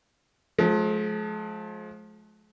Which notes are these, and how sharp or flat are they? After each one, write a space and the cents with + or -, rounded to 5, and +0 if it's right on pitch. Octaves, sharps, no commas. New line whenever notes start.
F3 +25 G#3 +45